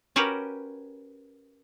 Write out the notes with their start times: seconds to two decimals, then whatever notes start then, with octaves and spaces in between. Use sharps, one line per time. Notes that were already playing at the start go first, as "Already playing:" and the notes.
0.16 C#4 F#4 G4 A#4 B4